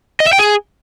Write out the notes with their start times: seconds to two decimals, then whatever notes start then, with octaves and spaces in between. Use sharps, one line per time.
0.20 D#5
0.27 E5
0.33 G5
0.39 G#4